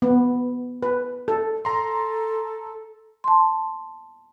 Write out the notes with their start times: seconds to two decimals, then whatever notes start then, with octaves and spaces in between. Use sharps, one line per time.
0.02 B3
0.83 B4
1.28 A4
1.65 A4 A#5 C6
3.24 A5 C6